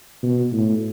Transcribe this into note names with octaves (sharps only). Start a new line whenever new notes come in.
B2
A2